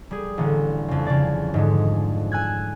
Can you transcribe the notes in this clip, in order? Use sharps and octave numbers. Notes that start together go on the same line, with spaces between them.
G3 G#4
A1 D3
F2 C#3
C#3 D5
G#2 D3 G#3
G#5 E6 F#6 G#6